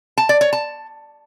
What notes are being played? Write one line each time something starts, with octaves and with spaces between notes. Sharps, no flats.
A5
D5
C#5
A5